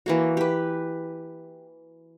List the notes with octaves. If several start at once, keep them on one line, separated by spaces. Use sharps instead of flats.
E3 A#3 F#4
G4 B4